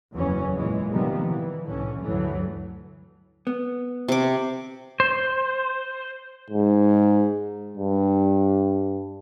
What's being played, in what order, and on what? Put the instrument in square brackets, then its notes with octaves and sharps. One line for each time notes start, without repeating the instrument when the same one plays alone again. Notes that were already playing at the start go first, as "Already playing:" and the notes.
[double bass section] F#1 E2 E3 F#3 C#4
A#2 E3 G#3
C3 D#3 F3 G3 A#3 B3
E3
C2 A2 D3 E3 C#4
D2 G2 E3 F#3 A3
[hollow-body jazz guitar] B3
[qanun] C3 D6
[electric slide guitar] C5
[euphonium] G#2
G2